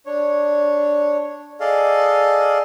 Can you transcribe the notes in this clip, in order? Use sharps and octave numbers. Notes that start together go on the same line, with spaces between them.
D4 C#5
G#4 A4 D5 D#5 F5